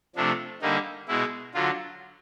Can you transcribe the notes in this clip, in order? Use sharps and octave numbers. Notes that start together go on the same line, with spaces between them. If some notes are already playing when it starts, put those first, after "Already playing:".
C3 F3 A3 D4
D3 G3 A#3 D#4
B2 G#3 E4
D3 F#3 F4